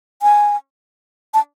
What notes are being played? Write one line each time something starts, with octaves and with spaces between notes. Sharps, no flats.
G#5
A5